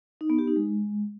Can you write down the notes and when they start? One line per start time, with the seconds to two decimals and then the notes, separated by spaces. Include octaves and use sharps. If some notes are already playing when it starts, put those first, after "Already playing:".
0.21 D#4
0.30 B3
0.38 G4
0.47 D#4
0.56 G#3